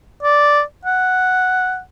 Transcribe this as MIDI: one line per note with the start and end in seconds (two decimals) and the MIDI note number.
0.23 0.62 74
0.85 1.80 78